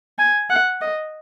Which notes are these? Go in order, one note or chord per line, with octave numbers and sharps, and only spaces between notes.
G#5
F#5
D#5